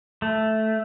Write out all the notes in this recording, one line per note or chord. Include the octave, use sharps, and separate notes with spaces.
A3